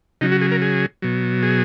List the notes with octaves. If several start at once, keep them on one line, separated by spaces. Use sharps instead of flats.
C#3 F#3 D#4
F#4
G#4
A#4
G#4
B2 F#3
G#4